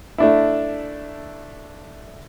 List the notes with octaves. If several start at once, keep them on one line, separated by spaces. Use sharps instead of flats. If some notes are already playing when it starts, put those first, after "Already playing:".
A3 D4 E4